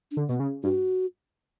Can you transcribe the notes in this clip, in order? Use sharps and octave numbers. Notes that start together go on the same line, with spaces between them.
D4
D3
B2 B3
C#3
G2 F#4